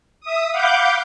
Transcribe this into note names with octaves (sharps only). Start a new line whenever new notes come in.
E5 D#6
F5 F#5 B5 D6 G6